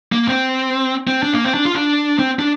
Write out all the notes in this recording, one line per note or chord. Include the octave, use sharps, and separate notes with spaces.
A#3
C4
C4
D4
A#3
C4
D4
F4
D4
C4
D4